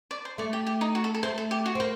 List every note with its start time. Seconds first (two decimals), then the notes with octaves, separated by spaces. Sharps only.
0.11 D5
0.25 C5
0.38 A3 D5
0.53 G4
0.67 G4
0.81 D#4
0.95 F#4
1.04 A4
1.14 A4
1.23 A3 C5
1.38 A4
1.51 G4
1.66 F#4
1.75 C4
1.80 A#3 C5